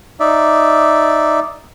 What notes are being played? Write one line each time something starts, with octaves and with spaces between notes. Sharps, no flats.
D#4 D5 E5